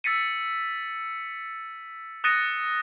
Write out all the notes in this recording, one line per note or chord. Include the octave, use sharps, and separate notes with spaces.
E6 A6 B6 C#7 D#7
D#6 F#6 A6 A#6 C#7 D#7